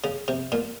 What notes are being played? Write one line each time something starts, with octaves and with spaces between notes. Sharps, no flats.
C#3
C3
A#2